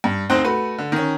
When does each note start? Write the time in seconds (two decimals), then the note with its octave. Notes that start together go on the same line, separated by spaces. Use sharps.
0.04 G2
0.30 D2 C4 D#4 C5 F#6
0.44 A3 F#4 B4
0.78 D3
0.92 D#3 C#4